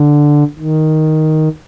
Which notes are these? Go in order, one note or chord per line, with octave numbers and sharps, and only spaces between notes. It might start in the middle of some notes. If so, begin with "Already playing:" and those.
Already playing: D3
D#3